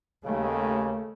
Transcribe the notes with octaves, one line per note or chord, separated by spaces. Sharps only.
D#2 C#3 A3